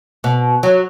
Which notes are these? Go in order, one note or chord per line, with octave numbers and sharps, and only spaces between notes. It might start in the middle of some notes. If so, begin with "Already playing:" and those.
B2
F#3